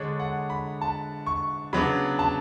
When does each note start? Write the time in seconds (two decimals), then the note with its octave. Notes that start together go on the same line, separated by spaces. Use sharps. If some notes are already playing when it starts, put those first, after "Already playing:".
Already playing: D3 G#3 D4 C#5
0.20 F#5
0.50 B5
0.81 A5
1.26 C#6
1.73 C#3 F#3 B3 D4 B5
2.19 A5